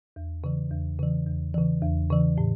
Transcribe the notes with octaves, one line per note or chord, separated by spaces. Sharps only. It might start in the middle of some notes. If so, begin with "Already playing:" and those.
E2
C#3 E3
E2
C#3 E3
E2
C#3 E3
E2
C#3 E3
A2